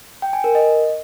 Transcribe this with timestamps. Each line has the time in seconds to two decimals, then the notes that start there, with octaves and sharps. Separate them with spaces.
0.22 G5
0.33 G#5
0.44 A#4
0.55 D#5